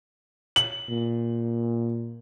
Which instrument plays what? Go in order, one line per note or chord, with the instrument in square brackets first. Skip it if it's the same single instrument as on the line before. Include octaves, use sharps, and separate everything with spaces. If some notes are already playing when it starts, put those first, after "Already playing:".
[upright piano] F#7
[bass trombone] A#2